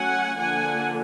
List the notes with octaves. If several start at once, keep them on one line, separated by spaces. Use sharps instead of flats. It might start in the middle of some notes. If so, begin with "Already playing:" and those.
Already playing: F#3 A3 C#4 F#5 G#5
D3 F3 A#3 D4 F#5 G#5